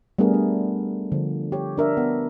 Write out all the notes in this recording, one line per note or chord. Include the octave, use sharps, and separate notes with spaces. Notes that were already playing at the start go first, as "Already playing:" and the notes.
G3 A3 B3 D4 G#4 A#4
D4
D3 F3
G4 C#5
D4 A#4 E5
B3